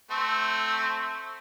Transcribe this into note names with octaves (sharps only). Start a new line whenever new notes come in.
A3 C4